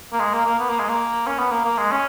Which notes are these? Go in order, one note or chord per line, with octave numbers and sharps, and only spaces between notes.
A#3
G#3
A#3
A#3
B3
A#3
G#3
A#3
C#4
B3
A#3
A#3
G#3
C#4